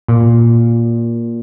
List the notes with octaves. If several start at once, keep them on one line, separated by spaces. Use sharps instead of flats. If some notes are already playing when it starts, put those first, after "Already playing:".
A#2